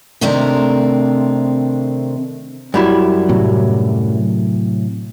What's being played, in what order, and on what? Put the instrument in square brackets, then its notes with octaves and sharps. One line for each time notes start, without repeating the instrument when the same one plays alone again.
[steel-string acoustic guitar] C3 D#3 A3 C4 D4 A#4
[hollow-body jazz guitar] F#2 G3 E4
[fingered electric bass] A2 C3 F#3